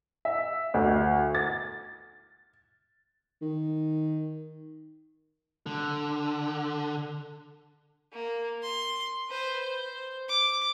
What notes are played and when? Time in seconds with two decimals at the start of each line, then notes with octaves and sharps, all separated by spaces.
0.25 E5
0.74 D2
1.35 A6
3.42 D#3
5.66 D3
8.12 A#3
8.62 C6
9.28 B4 C5
9.60 C5
10.28 D6